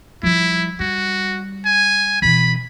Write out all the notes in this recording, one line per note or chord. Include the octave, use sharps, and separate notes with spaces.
F3 G3 E4
G3 F#4
G#5
B2 E3 B5